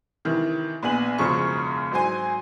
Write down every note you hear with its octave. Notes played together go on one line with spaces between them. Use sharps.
C3 D#3 E3
A#1 B3 G#5 F#7
E1 F#2 C#3 F3 C#6
G#1 F#3 C5 G#5